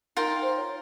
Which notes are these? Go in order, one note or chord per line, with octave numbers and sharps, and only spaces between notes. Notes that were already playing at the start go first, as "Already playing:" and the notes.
D#4 F4 A#4 G5
C5
C#5